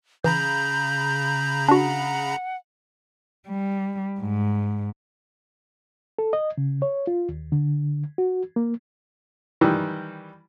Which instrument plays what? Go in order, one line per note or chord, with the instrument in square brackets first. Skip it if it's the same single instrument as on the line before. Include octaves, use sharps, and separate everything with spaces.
[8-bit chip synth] C#3 A#5 B5 [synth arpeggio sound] E3 [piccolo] G6
[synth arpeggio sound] D4 F#4 [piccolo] F#5
[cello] G3
G#2
[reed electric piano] A4
D#5
C#3
C#5
F4
D#2
D3
F#4
A#3
[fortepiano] D#3 E3 G3